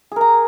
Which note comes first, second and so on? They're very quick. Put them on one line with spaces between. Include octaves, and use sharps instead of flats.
G#4 A#4 A#5